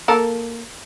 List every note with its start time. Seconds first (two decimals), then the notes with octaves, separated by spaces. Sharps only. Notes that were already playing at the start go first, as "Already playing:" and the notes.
0.08 A#3 A4 A#4